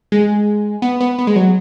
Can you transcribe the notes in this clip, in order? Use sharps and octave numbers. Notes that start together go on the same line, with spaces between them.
G#3
B3
B3
B3
G#3
F#3